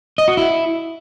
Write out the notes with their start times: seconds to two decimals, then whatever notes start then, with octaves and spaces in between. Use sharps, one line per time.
0.18 D#5
0.28 F#4
0.37 E4